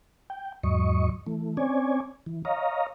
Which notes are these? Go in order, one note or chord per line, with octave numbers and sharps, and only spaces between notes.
G5
E2 G#2 F#3 D#5 C#6
E3 A3
C4 C#4 C#5 D5 G#5
E3
C#5 D#5 F5 A#5